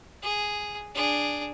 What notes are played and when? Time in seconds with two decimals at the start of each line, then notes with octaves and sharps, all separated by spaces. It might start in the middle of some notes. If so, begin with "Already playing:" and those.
0.22 G#4
0.94 D4 G#4